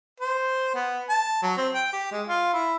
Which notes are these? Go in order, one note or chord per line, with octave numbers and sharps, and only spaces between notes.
C5
B3
A5
F#3
C4
G5
G4
G#3
F4
E4